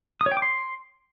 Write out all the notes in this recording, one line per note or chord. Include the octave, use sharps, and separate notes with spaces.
D#6
C#5
G5
D6
C6